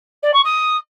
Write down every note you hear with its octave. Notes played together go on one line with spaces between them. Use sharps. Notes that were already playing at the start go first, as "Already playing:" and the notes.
D5
C#6
D#6